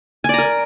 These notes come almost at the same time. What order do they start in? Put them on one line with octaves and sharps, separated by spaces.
G#5 D5 A#5 A#4